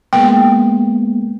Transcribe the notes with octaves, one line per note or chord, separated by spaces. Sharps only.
G#3 A#3 B3 G5